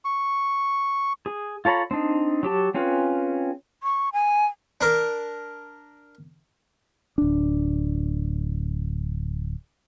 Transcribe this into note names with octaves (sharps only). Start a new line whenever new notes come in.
C#6
G#4
F4 A4 C#5 A#5 B5
C4 D4 D#4
F#3 G4 A5
C4 C#4 F4 G#4 B4
C#6
G#5
D4 A#4
D1 D4